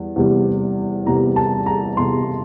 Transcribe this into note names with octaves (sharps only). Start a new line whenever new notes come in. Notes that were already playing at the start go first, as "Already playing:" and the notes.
Already playing: E2 G3
E2 C3 G3
E2 C3 G3 A#5
A5
A#5
E2 C3 G3 C6